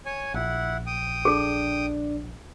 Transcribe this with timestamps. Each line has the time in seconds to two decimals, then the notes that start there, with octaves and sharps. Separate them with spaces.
0.06 C#5 G#5
0.34 A#1 E4 F#5
0.86 G5 D#6
1.25 D4 G#4 A4